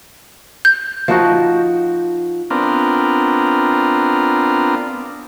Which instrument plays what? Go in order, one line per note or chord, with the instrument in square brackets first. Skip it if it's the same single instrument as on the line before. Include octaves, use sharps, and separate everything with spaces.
[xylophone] G6
[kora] F3 D#4 F#4
[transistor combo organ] B3 C4 D4 F4 A#4